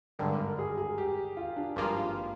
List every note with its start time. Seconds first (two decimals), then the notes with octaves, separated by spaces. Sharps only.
0.19 G#1 G2 D3 A#4
0.38 A#4
0.59 G#4
0.78 G#4
0.98 G4
1.37 F4
1.56 D4
1.76 G#1 G2 F3 A#3 F4